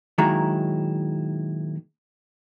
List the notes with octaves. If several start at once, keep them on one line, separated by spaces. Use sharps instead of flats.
A#2 D#3 F#3 G#3 E4 A#5